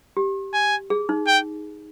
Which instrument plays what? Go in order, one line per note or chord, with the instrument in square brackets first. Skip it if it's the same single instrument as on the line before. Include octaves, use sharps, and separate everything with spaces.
[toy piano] G4
[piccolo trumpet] G#5
[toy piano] G#4
D#4
[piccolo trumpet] G5